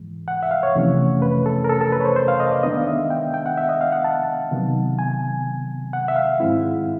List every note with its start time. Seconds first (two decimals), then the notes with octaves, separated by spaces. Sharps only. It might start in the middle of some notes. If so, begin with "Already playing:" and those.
Already playing: G#2 E3 G#3
0.28 F#5
0.43 E5
0.51 F5
0.63 C#5
0.75 F2 C3 E3 A3 C#4
1.22 B4
1.46 A4
1.64 A#4
1.69 A4
1.81 A4
1.92 B4
2.00 C#5
2.05 C5
2.16 C5
2.28 F5
2.40 D#5
2.51 D5
2.63 D#3 G#3 B3 D4 D#5
2.77 F5
2.87 E5
3.10 G5
3.34 G5
3.46 F#5
3.58 E5
3.69 D#5
3.81 F5
3.92 F#5
4.04 A5
4.51 C3 D#3 F#3 B3
4.99 G#5
5.93 F#5
6.08 E5
6.16 F5
6.40 G#2 D#3 G#3 C4 E4